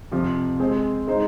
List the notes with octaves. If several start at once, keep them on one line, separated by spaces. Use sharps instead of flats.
F2 C3 F3
G#3 C4 G#4 C5
G#3 D#4 C5